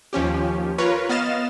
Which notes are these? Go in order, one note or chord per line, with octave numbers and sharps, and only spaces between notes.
D#2 F3 C#4 G4
F4 A#4 B4 C#5
B3 D#5 F5 F6 A6 E7